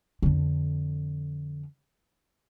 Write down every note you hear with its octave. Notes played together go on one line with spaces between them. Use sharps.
F2 D3